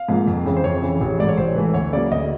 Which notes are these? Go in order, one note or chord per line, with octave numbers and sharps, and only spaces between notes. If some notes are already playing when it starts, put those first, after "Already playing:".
Already playing: F5
G#2 F3 A#3
F2
C#3 E3
C5
F2 C#5
C#3 E3
A1
G#2 E3 A3 D5
C#5
A1 C5
G#2 E3 A3 B4
D2 C#5
C#3 F#3 A#3 D5
D2 D#5